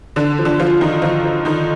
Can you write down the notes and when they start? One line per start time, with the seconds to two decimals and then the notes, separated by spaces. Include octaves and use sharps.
0.16 D3 D4
0.38 F3
0.45 D3 D4
0.59 D3 F3 F4
0.81 D#3 F3 D#4
1.02 D3 F3 F4
1.24 F3
1.45 D3 D#3 D#4